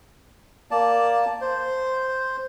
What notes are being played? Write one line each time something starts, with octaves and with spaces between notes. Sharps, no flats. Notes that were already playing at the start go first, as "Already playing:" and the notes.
A#3 D5 A5
C5